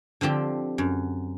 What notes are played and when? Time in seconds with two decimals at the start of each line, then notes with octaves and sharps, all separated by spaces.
0.21 D3 F3 C4 G4
0.78 F#2